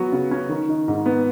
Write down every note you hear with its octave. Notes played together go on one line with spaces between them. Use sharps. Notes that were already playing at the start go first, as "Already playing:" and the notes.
Already playing: F#3 B3 F#4
C#3
C#4
D#3
D#4
G#2
B3